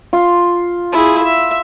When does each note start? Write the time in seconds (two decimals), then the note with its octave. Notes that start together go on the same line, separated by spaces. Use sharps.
0.13 F4
0.93 E4 G#4
1.23 E5